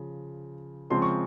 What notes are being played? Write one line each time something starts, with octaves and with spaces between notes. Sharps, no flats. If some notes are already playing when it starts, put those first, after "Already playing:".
Already playing: C#3 F3
C#3 F3 G#3 C4 C6
C#6